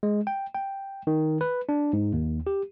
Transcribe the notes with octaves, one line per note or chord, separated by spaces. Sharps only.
G#3
G5
G5
D#3
B4
D4
G#2
D#2
G4